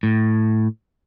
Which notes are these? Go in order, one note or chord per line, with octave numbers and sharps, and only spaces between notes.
A2